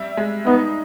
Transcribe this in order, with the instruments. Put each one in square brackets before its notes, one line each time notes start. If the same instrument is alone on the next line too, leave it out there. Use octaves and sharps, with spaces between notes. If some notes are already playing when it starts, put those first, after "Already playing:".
Already playing: [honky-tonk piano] G3 E5
G#3
[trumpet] B3 [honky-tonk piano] D#4